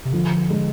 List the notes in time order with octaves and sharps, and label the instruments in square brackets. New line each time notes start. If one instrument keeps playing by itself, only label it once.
[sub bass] C3
[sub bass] D3 [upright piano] F3
[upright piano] G#3